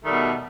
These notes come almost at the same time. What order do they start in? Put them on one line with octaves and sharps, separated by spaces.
A3 D#3 G3 B2